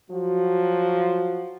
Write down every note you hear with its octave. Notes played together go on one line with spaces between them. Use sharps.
F3 F#3 F#4